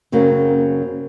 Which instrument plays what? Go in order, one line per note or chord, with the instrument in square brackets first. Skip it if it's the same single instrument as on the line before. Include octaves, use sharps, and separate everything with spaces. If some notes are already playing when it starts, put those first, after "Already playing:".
[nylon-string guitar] F#2 C#3 F#3 A#3 C4